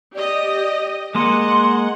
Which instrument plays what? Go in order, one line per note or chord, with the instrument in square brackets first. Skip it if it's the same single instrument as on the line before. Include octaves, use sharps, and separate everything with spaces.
[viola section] G4 D#5 [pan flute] D5
[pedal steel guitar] G#3 A#3 D#5 [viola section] F#5 [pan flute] C6